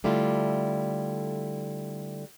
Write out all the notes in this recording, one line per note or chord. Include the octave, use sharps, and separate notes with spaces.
D3 G3 A3 E4 F4